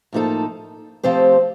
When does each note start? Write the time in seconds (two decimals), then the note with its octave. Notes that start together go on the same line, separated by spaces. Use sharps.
0.13 A2 F3 A#3 D#4 A4
1.03 F3 A3 C4 G4 C5